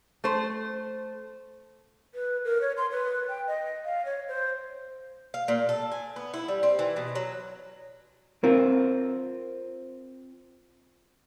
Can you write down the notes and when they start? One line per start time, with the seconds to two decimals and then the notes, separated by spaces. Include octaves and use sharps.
0.24 A3 C5
2.15 B4
2.44 A#4
2.61 C#5
2.77 C6
2.91 B4
3.29 G5
3.47 D#5
3.85 F5
4.05 C#5
4.28 C5
5.34 F5
5.48 A#2
5.69 A4
5.92 G#5
6.16 B3
6.34 E4
6.48 G3
6.63 C4
6.79 E3
6.96 B2
7.15 F#3
8.44 C4 F4 A#4